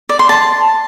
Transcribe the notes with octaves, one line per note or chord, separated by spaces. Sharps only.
D5
C6
A5